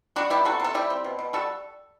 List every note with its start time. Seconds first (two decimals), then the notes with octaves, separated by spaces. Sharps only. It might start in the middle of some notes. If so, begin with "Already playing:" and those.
0.16 G3 D4 F#4
0.30 B3 E4 G4
0.45 C3 F#4 A4
0.60 C3 A4
0.74 G3 E4 G4
0.90 C4
1.04 B2
1.19 B2
1.33 G3 F#4 A4